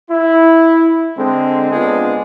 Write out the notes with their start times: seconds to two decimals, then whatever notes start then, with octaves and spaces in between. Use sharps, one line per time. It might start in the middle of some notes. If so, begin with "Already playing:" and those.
0.11 E4
1.18 D3 G#3 C4
1.71 C#2 G#3 B3 C4 D4 F4